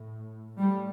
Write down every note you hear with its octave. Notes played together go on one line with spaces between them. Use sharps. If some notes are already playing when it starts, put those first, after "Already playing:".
Already playing: A2
A2 G3